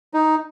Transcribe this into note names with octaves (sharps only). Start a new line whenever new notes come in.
D#4